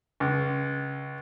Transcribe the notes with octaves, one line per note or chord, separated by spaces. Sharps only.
C#2